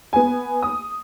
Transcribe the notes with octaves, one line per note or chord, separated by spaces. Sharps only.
B3 G#5
D#6